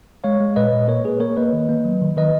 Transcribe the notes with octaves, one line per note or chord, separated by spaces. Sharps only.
G#3 C#5 F5
G#3
A#2 B4 D#5
A#2
A#3 A#4 C#5
A#3 G#4 B4
A#3 A#4 C#5
A#3 B4 D#5
D#3
A#3
F#3
D#3
D#3 B4 D#5